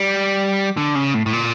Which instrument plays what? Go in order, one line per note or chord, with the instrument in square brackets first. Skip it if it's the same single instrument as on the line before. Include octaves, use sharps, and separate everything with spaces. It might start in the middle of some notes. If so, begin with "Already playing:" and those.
Already playing: [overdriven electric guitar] G3
D3
C#3
A2
A2
A#2